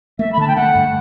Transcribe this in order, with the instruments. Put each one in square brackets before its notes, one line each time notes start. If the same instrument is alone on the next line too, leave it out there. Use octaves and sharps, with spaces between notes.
[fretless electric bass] A3 [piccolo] E5
[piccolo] B5
[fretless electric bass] D3 [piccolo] A5
[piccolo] G5
[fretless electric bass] A3 [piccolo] F#5
[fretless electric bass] G2